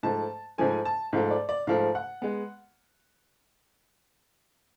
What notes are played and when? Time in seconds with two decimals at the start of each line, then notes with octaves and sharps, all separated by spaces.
0.03 G#2 F3 A3 A5
0.58 G#2 F3 A3 G#5
0.85 A5
1.13 G#2 F3 A3 F5
1.31 D5
1.49 D5
1.67 G#2 F3 A3 F5
1.95 F#5
2.22 G#3 B3